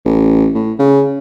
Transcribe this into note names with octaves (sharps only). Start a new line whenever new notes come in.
A1
A2
C#3